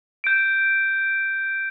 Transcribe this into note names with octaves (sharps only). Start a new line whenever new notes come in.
G6 D7